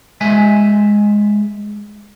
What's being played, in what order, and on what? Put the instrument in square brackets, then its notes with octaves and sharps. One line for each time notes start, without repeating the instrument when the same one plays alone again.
[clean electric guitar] G#3 E5 G#5